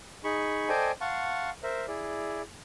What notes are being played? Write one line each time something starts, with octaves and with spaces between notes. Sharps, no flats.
D#4 G#4 B5 C#6
A4 C5 D5 D#5 G5 G#5
F5 F#5 A5 C6 C#6
A#4 C5 E5
E4 G#4 D5